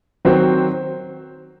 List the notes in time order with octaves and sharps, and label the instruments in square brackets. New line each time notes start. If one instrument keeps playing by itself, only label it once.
[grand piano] D#3 F#3 C4 F#4 C5